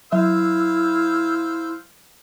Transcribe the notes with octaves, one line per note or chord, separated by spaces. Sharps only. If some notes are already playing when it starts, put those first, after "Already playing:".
F#3 E4 C5 E5 F5 E6